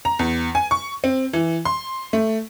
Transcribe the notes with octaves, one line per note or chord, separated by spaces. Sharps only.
A#5
E2
G#5
C#6
C4
E3
C6
A3